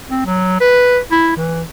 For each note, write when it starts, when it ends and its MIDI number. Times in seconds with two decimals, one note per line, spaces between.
0.09 0.23 60
0.26 0.57 54
0.60 0.99 71
1.11 1.32 64
1.36 1.63 52